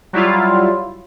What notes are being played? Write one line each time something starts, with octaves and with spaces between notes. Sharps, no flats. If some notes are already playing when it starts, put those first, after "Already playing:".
F#3 G3 E4 F4